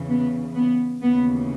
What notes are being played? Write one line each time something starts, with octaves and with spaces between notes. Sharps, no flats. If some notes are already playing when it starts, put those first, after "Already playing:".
Already playing: E2 C#3 E3
B3
B3
D#2 C#3 E3 B3